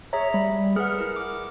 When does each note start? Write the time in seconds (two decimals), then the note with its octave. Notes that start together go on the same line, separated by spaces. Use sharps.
0.13 G#4 C#5 E5 A#5
0.34 G3 B5
0.76 G#4 B4 F#5 F6
0.98 E4 A#4
1.16 D6